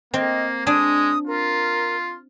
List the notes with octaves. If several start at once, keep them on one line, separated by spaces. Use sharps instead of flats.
A#3 C4 D#5
G#3 D4 G#5 D#6
F4 A#4